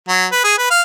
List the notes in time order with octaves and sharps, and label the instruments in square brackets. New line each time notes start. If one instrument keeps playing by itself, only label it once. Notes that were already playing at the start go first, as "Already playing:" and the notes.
[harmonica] F#3
B4
G#4
B4
F5